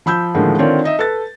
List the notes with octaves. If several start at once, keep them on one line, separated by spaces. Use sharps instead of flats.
F3 B5 E6 G6
A2 D3 D#3 F3 G#3 A#3
D3 D#3 C4 F4 C#5 D5
D#4 D#5 E5
A4 B4 A6